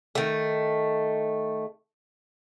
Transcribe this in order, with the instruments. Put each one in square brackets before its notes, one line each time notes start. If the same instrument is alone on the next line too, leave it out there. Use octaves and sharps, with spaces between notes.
[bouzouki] D#3 A3